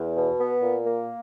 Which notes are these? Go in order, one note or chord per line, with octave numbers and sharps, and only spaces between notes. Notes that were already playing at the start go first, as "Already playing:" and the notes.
Already playing: E2
B2
B3
A#2
A#3